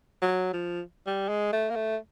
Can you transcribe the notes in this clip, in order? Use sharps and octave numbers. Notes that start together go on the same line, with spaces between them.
F#3
F3
G3
G#3
A3
A#3
A3